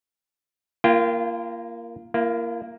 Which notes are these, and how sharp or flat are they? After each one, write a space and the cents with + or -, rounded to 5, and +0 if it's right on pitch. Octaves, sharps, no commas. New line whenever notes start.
A#3 +0 F4 -35 G5 +0
A#3 +0 E4 +45